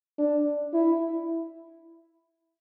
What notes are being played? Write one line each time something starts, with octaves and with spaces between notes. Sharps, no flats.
D4
E4